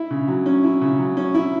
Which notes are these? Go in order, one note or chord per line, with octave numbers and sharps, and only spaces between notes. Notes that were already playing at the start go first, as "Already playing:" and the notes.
Already playing: E4
C#3
F#3
C#4
E4
C#3
F#3
C#4
E4